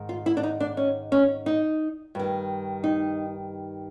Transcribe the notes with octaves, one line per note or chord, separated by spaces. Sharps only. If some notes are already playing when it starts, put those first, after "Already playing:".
Already playing: G#2 D#3
F4
E4
D4
D#4
D4
C#4
C#4
D#4
G2 D#3
D#4